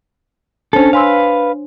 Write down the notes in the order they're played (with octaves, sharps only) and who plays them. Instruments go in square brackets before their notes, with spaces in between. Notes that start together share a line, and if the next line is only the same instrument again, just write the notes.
[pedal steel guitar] C#4 A4 [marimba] D4 C5 C#5
[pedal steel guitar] B4 F5 [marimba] G#5 C6 E6